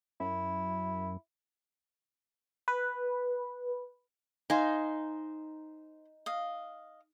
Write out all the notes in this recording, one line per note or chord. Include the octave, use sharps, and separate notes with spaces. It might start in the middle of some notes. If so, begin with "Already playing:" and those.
F#2 E4
B4
D#4 C5 F5 G#5
D#5 F5